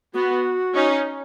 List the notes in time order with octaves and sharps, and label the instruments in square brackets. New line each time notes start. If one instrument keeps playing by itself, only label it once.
[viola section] B3 [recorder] F#4
[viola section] C#4 D#4